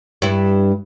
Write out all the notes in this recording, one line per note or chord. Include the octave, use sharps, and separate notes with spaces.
G2 E4